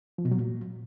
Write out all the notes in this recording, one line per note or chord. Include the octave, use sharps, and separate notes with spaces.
F3
B2
F#3
A#2